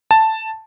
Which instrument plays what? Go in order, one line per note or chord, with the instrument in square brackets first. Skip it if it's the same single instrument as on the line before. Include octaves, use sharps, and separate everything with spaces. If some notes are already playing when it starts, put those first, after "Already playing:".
[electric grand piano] A5